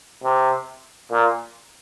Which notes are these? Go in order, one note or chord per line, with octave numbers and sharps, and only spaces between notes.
C3
A#2